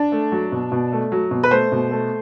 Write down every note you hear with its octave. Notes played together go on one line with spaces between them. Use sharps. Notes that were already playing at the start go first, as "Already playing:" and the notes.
Already playing: D4
A3
F#3
B2
B2
A3
F#3
B2
B4
A3 C5
B2
A3